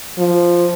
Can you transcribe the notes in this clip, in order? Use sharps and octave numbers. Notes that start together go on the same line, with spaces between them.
F3